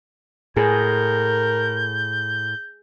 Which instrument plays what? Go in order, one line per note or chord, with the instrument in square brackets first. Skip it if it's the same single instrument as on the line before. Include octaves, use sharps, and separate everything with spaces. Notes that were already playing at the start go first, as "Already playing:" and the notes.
[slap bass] A2 [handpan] G#4 [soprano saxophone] A#4 [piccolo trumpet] G6